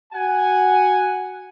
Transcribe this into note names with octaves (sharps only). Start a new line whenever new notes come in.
F#4 F#5 G#5